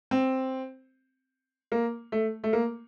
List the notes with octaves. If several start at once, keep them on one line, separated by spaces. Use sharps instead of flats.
C4
A#3
A3
A3
A#3